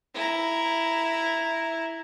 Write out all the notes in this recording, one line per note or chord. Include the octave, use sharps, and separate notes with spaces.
E4 A#5